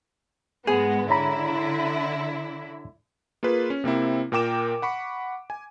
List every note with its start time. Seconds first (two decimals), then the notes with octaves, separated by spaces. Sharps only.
0.67 G#2 G#3 B3 G#4
1.10 D3 E4 C#5 A#5 B5
3.43 A#3 F4 G#4 B4
3.70 C#4
3.84 C3 A#3 C4 E4
4.32 A#2 A#4 G5 D6 E7
4.82 F#5 B5 C#6
5.50 G#5